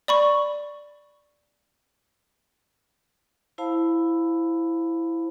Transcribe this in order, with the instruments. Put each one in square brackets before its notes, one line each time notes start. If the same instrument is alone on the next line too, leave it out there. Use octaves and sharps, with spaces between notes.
[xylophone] D5 B5 C#6
[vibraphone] E4 C5 F5 A5 B5